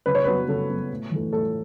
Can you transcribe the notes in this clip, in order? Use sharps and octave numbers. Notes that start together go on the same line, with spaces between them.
C#3 B4
C#5
B4
F#3 B3
C#3 A4
F#3 B3
A2
E3 A3
A2 A4